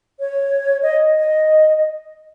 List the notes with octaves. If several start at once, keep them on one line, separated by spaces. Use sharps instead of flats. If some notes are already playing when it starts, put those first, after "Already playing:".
C#5
D#5
D#5